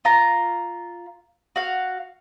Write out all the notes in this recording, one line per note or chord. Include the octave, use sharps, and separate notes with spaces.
F4 A#5
F#4 F5